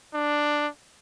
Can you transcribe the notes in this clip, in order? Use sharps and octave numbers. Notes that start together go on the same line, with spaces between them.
D4